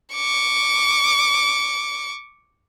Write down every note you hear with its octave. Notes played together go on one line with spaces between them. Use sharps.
C#6 D6